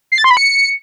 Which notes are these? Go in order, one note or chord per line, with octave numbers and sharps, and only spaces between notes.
C7
A6
C6
B5
C#7